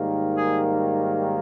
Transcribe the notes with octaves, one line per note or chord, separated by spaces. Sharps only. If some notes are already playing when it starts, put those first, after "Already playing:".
Already playing: G#2 D#3 G3 A#3
G#4